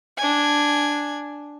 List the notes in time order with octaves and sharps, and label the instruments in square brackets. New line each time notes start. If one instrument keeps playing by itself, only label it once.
[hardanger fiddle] D4 G#5